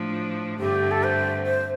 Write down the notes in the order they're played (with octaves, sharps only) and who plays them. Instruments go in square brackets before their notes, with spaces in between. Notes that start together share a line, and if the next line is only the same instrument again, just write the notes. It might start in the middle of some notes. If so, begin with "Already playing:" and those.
Already playing: [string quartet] A2 F3 D4
[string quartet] G2 D3 A3 C4 [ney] G4
[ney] A4
C5
C5